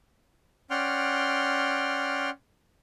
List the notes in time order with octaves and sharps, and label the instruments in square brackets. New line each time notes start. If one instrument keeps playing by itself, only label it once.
[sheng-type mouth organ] C#4 D5 F#5 G5 C6 F6